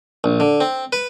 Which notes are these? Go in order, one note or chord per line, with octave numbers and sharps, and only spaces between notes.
A#1
D3
C4
B4